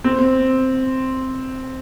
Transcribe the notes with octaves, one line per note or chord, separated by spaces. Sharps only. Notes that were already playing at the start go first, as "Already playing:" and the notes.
C4